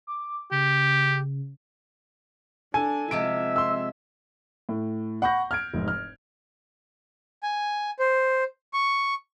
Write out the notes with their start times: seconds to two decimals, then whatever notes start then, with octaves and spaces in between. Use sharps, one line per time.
0.07 D6
0.51 C#3 G4
2.74 D4 A4 G#5
3.11 C3 F3 G#3 E5 D7
3.56 C6 E6
4.69 A2
5.22 F#5 B5 C#6 G6 A#6
5.51 F6 G#6 D7
5.74 F1 G#2
5.88 F6
7.43 G#5
7.99 C5
8.73 C#6